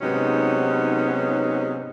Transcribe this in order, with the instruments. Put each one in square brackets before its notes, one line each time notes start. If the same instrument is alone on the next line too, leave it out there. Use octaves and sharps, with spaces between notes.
[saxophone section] G#2 C3 F#3 B3 C#4 D#4